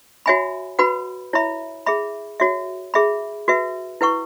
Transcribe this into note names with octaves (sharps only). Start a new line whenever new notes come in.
F#4 C#5 E5 G#5 B5
F#4 B4 F#5 B5
E4 C#5 E5 B5
G#4 E5 B5
F#4 C#5 E5
G#4 E5 B5
F#4 B4 E5
E4 B4 F#5 C#6